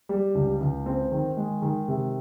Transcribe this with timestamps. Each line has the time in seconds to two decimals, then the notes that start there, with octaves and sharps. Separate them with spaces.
0.09 G3
0.35 C#2
0.60 C#2
0.86 C4
1.12 D#3
1.37 G#3
1.62 D#3
1.88 C3